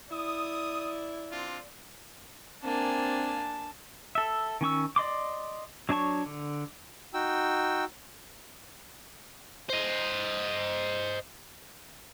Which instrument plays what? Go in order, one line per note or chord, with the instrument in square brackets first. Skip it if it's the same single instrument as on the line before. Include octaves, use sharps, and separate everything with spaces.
[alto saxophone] E4 [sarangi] D5 [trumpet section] D#6
[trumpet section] C4 D4 F4
[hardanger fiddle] A#3 G#5 [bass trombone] C4 [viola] D4 [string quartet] A5
[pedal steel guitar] A4 E5
D#3 C#4 C#6 E6
D5 D#5 C6 D6
F#3 D4 C#5 A5 C#6
D3
[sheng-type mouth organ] D#4 F#4 G5 E6
[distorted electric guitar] C5 D#5